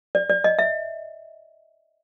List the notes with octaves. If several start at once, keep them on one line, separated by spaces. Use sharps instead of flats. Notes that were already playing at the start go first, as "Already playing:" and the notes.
D5
D5
D#5
E5